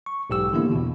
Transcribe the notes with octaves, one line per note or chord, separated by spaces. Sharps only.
C#6
B1 G#2 G4 E6
D3 E3 A#3 B3 E4
E2 B2